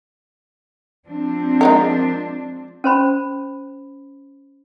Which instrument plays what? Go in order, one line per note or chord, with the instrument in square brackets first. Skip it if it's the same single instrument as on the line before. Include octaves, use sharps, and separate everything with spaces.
[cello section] F3 C4 D4
[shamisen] G#3 D#4 A#4
[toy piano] C#4 C5 B5